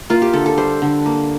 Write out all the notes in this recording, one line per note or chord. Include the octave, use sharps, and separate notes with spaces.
A#3 F4
G4
D3 A4
A4
G3 C5
D3
A#3